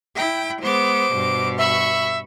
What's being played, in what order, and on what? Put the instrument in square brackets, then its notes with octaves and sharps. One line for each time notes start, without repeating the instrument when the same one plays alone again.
[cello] E4 G5
[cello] G#3 B3 [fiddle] C5 D6
[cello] G2 B2
[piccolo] E5 [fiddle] B5 C#6